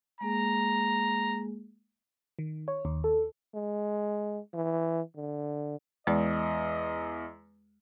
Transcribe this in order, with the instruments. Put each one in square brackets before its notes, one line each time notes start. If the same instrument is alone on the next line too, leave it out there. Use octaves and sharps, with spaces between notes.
[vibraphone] G#3 A#3 G#4 [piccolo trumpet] A#5
[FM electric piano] D#3
C#5
D#2
A4
[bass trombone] G#3
E3
D3
[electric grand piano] E2 [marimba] G#3 D5 [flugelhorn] D#5